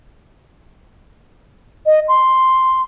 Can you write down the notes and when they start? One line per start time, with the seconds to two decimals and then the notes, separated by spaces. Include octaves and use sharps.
1.86 D#5
2.08 C6